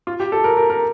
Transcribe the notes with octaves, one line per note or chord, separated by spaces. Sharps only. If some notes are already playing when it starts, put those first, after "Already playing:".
F4
G4
A4
A#4
A#4
A#4